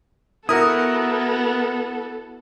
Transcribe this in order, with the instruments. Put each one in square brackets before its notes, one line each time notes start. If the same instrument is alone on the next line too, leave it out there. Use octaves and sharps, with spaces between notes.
[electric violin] B3 A4 [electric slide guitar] E4 F#4 [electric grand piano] A#4 D#6